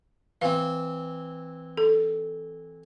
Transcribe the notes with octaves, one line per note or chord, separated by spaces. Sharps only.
E3 C4 F5
A4